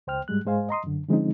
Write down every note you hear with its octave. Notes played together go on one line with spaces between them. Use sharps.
C#2 C5 G5 F6
G#2 G3 G#3 F#6
G#2 G#3 C5 F5 G#5
D#5 A#5 C6 D#6
F#2 D3
D3 F3 G#3 C4 C#4 D#4